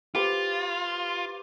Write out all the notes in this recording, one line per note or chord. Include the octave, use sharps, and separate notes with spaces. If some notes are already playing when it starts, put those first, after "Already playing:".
F4 G4 B4 C5